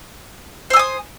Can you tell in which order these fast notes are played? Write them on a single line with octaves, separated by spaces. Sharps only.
C5 E6 G#5 D#6